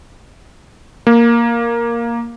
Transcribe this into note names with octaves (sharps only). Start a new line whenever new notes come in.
A#3